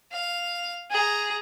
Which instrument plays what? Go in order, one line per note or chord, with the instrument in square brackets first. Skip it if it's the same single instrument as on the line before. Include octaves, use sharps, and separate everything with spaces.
[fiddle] F5
G#4 A#5